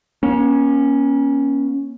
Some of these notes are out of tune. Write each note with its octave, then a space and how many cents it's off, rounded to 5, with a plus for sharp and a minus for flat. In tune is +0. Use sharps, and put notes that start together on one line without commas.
A#3 +40 C#4 +0